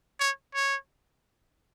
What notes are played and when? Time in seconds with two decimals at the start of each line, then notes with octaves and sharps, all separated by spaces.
0.20 C#5
0.55 C#5